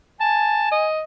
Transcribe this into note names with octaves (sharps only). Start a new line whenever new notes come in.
G#5 A5
D#5